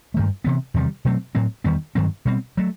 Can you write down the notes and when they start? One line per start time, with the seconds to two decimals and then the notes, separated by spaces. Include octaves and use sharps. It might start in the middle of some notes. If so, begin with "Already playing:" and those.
0.14 G2 D#3 A3
0.44 C3 E3 B3
0.74 E2 C3 D#3 G3
1.05 B2 F#3 A3 C4
1.35 A2 F#3 C4
1.64 E2 D#3 G3 B3
1.95 G2 D#3 F#3 C4
2.25 B2 G3 C4
2.57 F#3 A3